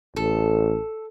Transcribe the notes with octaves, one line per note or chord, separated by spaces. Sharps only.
A1 A4